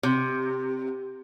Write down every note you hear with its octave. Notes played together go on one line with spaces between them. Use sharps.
C3